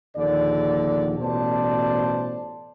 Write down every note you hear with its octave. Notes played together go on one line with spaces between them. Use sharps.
A#1 D#2 D3 D5
A1 B2 C5 D5 A5